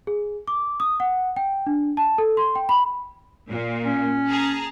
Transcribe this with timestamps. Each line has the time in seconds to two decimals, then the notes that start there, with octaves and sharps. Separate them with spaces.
0.07 G#4
0.47 D6
0.80 D#6
1.00 F#5
1.36 G5
1.67 D4
1.97 A5
2.18 A4
2.37 C6
2.56 G5
2.69 B5
3.49 A#2
3.84 C#4
4.28 G#4 A5 A#5